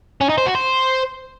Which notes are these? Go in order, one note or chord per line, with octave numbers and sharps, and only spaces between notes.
C#4
D#4
C5
F#4
C5